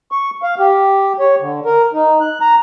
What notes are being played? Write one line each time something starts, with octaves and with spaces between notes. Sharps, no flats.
C#6
F5
G4
C#5
D3
A#4
D#4
F#6
A#5